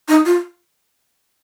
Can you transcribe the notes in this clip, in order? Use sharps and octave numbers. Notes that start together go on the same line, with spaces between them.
D#4
F4